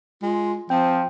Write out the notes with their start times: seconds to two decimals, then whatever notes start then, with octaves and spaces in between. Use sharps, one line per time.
0.22 G#3 F4
0.70 F3 C4 F4 G5